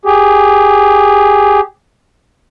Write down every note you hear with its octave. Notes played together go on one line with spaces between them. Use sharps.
G4 G#4